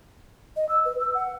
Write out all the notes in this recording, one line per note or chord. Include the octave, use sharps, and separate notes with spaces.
D#5
E6
B4
E6
F#5